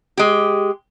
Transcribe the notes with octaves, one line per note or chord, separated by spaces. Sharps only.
G#3 G4